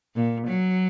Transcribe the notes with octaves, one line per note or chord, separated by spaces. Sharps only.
A#2
F#3